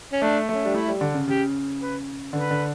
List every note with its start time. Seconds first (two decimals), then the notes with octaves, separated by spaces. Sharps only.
0.12 C#4
0.22 A3 D4
0.49 A3 C#4
0.64 G3 D4
0.74 A3 E4
0.88 G3
1.01 D3
1.14 C#3
1.28 C#3 G4
1.80 B4
2.33 D3 B4
2.51 D3